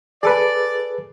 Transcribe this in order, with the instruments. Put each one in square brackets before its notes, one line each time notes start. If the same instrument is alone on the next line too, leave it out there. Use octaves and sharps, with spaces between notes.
[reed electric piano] G#4 A4 B4 [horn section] D5